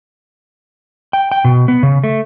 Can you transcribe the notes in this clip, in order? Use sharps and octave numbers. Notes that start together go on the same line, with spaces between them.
G5
G5
B2
B3
C#3
A3